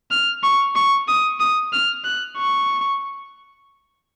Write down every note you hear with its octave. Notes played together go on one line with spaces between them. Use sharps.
F6
C#6
C#6
D#6
D#6
F6
F#6
C#6